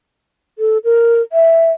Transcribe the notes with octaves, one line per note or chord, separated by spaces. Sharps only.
A4
A#4
E5